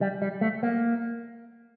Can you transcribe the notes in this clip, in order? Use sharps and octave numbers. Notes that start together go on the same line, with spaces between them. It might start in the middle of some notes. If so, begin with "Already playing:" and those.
G3
G3
A3
A#3